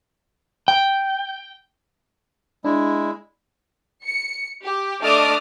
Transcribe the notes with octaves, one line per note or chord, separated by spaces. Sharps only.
G5
G#3 D4 E4
C#7
G4
A3 D4 D#5 D6 D#6 F6